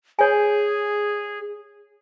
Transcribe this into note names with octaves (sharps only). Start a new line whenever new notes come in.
G#4 C#5 G#5